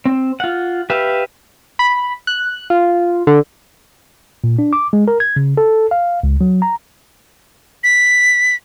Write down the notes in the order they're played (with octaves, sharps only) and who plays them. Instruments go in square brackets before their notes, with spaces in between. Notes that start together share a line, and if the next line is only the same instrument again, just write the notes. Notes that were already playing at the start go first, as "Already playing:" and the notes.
[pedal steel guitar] C4
F4 F#5
G4 B4 E5 F5
[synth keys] B5
F#6
F4
D3
[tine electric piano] A#2
D4
D6
G#3
A#4
G#6
C#3
A4
F5
C#2
F#3
A#5
[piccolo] B6